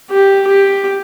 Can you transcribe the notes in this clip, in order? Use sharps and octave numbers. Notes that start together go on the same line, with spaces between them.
G4
G4